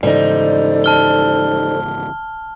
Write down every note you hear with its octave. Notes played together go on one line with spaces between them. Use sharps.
G#2 C#3 E3 G3 D#4 A4 C5 D5
A5 F6 G7